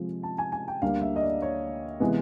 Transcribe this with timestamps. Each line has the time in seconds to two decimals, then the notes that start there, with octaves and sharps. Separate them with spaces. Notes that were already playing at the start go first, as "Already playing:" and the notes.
Already playing: C3 F3 G#3
0.23 A5
0.38 G#5
0.52 G#5
0.68 G5
0.82 D2 D3 G3 A#3 F5
1.02 E5
1.16 D#5
1.22 D5
1.42 C#5
2.00 C3 E3 G#3 B3